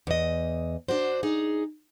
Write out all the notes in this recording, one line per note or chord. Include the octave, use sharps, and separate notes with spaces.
E2 D#5
D4 F#4 C5
D#4 G#4